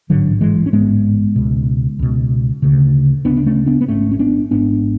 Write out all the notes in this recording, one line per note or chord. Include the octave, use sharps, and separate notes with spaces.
A1 G#2 D3 F#3
E3 G#3
C#4
A1 G#2 G#3 B3
C#2 B2
C#2 B2
D2 C#3
D2 C#3 B3 D4
D4
A3 C#4
B3 D4
B3
G#1 G#2 A3 C#4
C#4
B3 D4
G#1 G#2 B3 D4